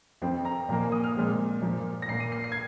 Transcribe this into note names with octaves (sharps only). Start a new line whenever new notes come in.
F2 F3 C4
A#5
A#2 F3 A#3 A#5
G#5
D#6
F6
A#2 F3 G#3 C4
A#2 F3 A#3
A#6
A#2 A#3 C7
D#7
C7
C7
G#6